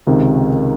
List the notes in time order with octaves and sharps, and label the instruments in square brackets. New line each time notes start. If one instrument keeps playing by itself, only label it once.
[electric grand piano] C#2 C3 D#3